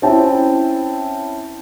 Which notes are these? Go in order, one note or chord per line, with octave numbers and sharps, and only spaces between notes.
C4 C#4 E4 G5 A5